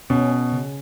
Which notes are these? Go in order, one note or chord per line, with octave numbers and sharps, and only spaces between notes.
B2 C#4
C#4
C#3